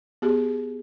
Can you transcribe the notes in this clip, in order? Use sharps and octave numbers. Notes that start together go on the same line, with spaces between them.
B3 G4 G#4